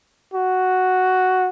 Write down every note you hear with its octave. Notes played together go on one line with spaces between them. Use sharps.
F#4